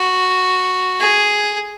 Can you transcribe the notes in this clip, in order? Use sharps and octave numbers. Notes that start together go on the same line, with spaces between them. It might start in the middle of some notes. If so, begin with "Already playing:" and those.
Already playing: F#4
G#4